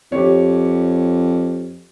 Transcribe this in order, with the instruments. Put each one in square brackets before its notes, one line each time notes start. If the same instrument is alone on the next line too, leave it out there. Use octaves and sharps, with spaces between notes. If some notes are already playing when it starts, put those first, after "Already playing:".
[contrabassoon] F2 [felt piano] G4 C#5